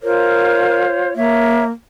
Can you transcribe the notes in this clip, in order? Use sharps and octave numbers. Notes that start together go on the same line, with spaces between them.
F4 A#4 C5 C#5
A#3 C#5 E5